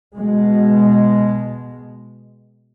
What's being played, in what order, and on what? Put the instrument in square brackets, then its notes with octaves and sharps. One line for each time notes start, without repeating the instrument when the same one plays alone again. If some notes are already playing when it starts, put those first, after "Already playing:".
[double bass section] B2 G#3